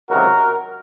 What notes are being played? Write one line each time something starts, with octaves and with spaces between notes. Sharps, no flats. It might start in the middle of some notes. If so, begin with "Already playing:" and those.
C#2 C3 D#3 F#3 F#4 A#4